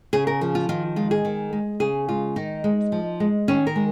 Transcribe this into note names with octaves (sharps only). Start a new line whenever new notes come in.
C#3 G#4
A#4
F3
F4
D#3 F4
G#3 F4
G#4
D#3
G#3
C#3 G#4
G#3 F4
D#3 D#4
G#3
F3
G#3
D#3 C#4
A#4
G#3